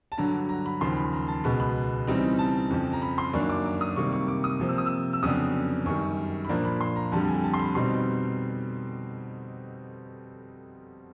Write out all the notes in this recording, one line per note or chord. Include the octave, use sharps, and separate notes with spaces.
A5
G2 D3 F#3 A#5
A#5
B5
D#2 C#3 F3 C6
B5
A#5
A5
C#2 B2 G#3 B3 B5
B5
C#3 E3 G3 C4 D#4
A5
F2 C#3 F3
A#5
B5
C6
F#2 D#3 F#3 A#3 D4 C#6
D6
D6
D#6
C3 D#3 G3 A#3 C#6
C#6
D6
D#6
C3 F3 A#3
E6
D#6
E6
E6
F2 C#3 F#3 B3 D4 D#6
F#2 D#3 G3 C#6
B5
A#2 F3 A#3 D4 A#5
B5
C6
A#5
F2 D3 G3 A5
G#5
A5
C6
B5
B2 G3 C4 D#4 C6